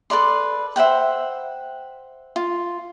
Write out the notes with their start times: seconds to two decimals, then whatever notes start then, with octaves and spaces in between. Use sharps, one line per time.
0.10 A4 B4 D5 C6
0.76 C5 E5 F#5 G5
2.36 F4